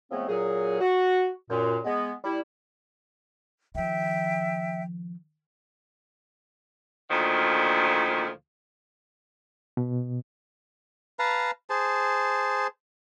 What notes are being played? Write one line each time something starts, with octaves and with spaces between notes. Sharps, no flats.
C#3 F3 G#3 A3 B3 C4
A#2 F#3 G#4
F#4
F#2 A#2
G#3 B3
G3 E4
D#3 F3 E5 G5
D2 A#2 D#3 F3
B2
B4 F5 A5 A#5
G#4 C5 A5